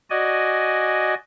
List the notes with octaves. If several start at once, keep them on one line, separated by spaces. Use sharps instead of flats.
F#4 D5 D#5 G#5